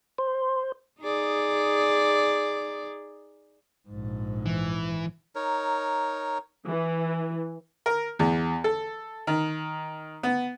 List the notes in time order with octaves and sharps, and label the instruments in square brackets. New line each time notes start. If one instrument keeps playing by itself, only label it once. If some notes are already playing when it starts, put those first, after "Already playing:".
[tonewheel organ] C5
[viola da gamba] D#4 G#4 D5
[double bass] A#1 G#2
[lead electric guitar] E3
[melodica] D#4 A#4 C#5
[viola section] E3
[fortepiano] A#4
E2
A4
D#3
B3